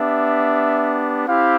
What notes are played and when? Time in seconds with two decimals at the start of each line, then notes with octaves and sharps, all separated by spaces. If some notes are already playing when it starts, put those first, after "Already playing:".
Already playing: B3 D4 G4 E5
1.27 C4 E4 G4 F5